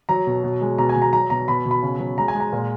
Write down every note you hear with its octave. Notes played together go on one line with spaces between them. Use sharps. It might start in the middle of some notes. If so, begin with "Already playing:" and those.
F#3 A#5
B2
B2
G#3
B2 A#5
G#5
B2
A#5
F#3 A#5
B2 A#5
B2 B5
B2
B5
C#3
F#3
G#3 A#5
G#5
G#3
A#5
A#2